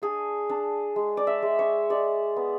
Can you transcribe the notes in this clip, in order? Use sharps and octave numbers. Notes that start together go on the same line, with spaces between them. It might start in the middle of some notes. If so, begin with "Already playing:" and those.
D4 G#4
D4
G#3
D5
E5
G#3
C#5
G#3 D5
B3